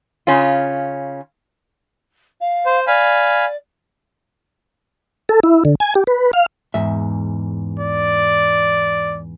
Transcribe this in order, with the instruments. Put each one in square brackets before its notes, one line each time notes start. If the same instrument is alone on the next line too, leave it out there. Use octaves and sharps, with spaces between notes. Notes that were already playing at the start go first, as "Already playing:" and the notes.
[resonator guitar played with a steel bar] C#3 C#4 F4
[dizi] F5
[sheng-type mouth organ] C5
[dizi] D5 [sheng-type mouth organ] F5 G#5 B5
[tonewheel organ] A4
E4
D3
G#5
G4
B4
F5
[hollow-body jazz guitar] E2 G#2 E5
[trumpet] D5